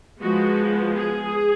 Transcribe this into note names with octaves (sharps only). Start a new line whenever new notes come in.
F3 G#3 B3 F#4
G#4